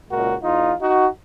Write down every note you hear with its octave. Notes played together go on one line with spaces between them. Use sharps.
C#2 A#2 G#3 F#4 A#4
E2 D#4 F4
D#4 F#4